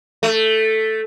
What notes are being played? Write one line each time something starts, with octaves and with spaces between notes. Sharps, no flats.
A3